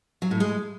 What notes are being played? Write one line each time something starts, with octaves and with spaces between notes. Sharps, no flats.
F#3
A2
G#3